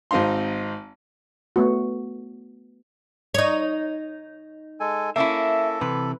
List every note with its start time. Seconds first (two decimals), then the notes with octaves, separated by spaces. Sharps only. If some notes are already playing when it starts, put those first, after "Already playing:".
0.11 G#1 C4 D#4 F5 C6
1.56 A3 B3 F#4
3.34 D#4 C#5
4.80 G#3 A4 G#5
5.16 A#3 C#4 E4 A4 E5
5.81 C3 E3 B4